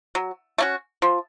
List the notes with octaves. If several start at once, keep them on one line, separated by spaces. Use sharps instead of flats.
F#3
A3 C#4 F#4
F3